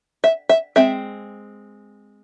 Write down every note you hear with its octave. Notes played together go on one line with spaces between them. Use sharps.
E5
E5
G#3 C4 E5